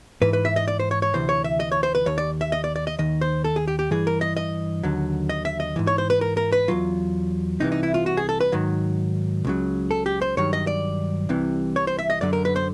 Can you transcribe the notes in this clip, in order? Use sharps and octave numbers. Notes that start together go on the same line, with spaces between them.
G#2 E3 B4
B4
E5
D#5
D5
C5
C#5
C#5
D2 C3 E3 C5
C#5
E5
D#5
C#5
C5
B4
D#2 D#3 C#5
D5
E5
D#5
D5
D5
D#5
D#2 D#3 D#5
C5
A4
G#4
G4
G4
G2 E3 G#4
A#4
D#5
D#5
D#2 D3 F#3
D#5
E5
D#5
G#2 E3
C#5
C5
B4
A#4
A#4
B4
E2 B2 F#3 F4
C2 C3 E3 D#4
D#4
E4
F4
F#4
G#4
A4
B4
G#2 D#3 F#3
C#2 C#3 F#3
A4
G4
C5
G2 D#3 F#3 C#5
D#5
D5
C2 C3 E3
C#5
C5
E5
D#5
F#2 D3 F#3 D5
A#4
B4
C5